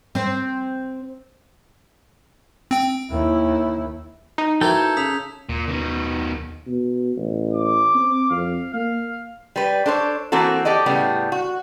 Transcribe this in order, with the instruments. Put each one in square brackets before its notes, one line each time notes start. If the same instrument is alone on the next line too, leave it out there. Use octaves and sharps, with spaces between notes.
[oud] C4 C5
[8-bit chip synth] C4 G5
[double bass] D#2 E4
[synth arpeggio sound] D#4
[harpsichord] E3 A#3 F#4 [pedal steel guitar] F3 A4 G5 [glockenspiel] A#5 G#6
[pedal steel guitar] A4 [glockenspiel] G6
[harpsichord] C#3 [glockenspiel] D#6 B6 F7
[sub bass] D#2 [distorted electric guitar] A#2
[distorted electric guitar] B2 D#3
[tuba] B2
A1
[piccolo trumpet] D6
[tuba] C4
[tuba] F2 [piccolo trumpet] F5
[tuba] A#3 [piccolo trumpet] F5
[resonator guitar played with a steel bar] G3 B4
D4 A4 C5 C#5
E3 A#3 C4 F#4 A4
G4 A4 D5 D#5
A2 C#3 G3 B3
F#4